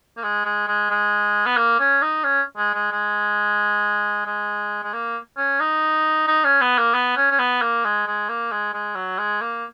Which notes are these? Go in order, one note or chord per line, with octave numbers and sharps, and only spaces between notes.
A#3
G#3
G#3
G#3
G#3
B3
A#3
C#4
D#4
C#4
G#3
G#3
G#3
G#3
G#3
A#3
C#4
D#4
D#4
C#4
B3
A#3
B3
C#4
C#4
B3
A#3
G#3
G#3
A#3
G#3
G#3
F#3
G#3
A#3